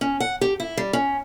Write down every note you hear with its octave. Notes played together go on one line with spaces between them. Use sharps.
C#4
F#5
G4
E4
G3
C#4